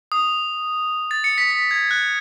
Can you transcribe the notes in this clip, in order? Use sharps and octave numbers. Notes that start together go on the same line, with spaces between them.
D#6
A6
C#7
B6
B6
G#6
F#6